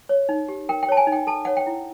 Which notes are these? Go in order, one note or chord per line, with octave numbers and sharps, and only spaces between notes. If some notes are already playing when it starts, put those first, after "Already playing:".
C#5
D#4
G4
A#4 G5
G5
C#5 A5
G#5
D#4
G5
A4 A5
C#5 F#5
G5
E4